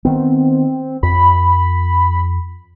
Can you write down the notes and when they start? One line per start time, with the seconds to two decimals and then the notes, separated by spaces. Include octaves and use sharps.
0.05 D#3 B3 C4
1.03 F2 B5